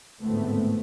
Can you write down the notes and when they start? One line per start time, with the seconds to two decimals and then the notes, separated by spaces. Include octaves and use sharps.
0.20 G#1 D2 A2 A3 B3 C4